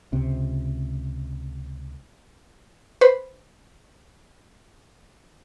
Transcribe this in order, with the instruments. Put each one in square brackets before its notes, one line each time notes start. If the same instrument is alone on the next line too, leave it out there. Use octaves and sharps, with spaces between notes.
[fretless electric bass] C#2 C3
[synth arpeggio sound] B4 C5 B5